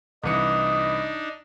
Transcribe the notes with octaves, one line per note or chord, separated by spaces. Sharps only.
C2 E3 D4 D#4 D#5 C#7